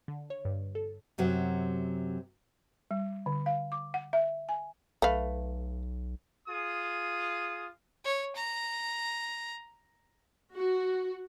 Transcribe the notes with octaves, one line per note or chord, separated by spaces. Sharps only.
D3
C#5
G2
A4
F#2 C3 F#3
G3
D3
F5
D6
F#5
E5
G#5
B1 A3 B4 F5
F4 G#4 D#6
C#5
A#5
F#4